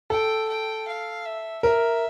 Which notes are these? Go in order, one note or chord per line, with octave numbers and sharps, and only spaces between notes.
A4 G5
G5
F5
E5
A#4 E5